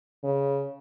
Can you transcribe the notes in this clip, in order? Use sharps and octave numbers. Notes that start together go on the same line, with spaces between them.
C#3